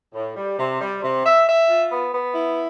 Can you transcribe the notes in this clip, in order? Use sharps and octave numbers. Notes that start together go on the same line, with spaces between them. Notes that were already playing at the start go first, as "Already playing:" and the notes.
A2
G3
C3
G3
C3
E5
E5
F4
B3
B3
E4